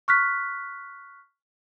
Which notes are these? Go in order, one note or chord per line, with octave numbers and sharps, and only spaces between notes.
C#6 F6 F#6 B6